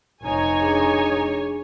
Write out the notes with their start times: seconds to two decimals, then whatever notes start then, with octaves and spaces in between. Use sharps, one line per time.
0.23 F1 D#4 C#5 G#5
0.61 D4 G#4